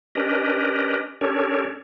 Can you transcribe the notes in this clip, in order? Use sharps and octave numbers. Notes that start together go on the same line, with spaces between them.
C#4 D4 G4 A#4 B4 D#5
C#4 D4 G4 A4 A#4 C#5